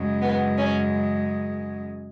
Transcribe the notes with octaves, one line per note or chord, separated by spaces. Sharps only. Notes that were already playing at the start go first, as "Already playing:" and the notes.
Already playing: F#2 C#3 G#3
B3
C#4